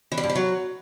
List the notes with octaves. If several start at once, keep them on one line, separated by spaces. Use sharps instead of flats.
E3
G3
G2
G3
F#3